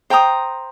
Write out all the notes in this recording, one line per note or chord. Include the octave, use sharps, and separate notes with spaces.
C5 G5 A#5 D#6